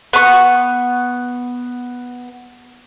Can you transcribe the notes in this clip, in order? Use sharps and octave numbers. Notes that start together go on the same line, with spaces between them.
B3 C#6